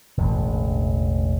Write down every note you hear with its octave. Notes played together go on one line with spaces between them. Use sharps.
E1 A1 D3